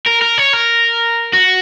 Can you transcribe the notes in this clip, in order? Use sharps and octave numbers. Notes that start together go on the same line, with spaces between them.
A#4
A#4
C#5
A#4
F#4